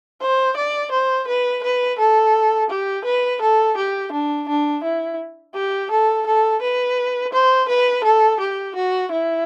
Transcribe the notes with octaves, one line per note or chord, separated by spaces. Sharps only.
C5
D5
C5
B4
B4
A4
G4
B4
A4
G4
D4
D4
E4
G4
A4
A4
B4
C5
B4
A4
G4
F#4
E4